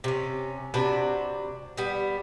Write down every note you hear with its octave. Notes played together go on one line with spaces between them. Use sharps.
C3 C#4
C3 D4 F#4 B4
G3 B3